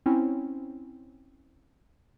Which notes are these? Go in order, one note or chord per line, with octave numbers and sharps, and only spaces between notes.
C4 C#4 E4